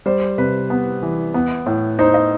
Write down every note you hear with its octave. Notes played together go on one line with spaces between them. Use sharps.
G3 C5
C3 B4
B3
E3
B3
A2
D#4 C5
D#5